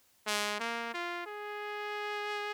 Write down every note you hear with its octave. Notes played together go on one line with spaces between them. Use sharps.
G#3
A#3
F4
G#4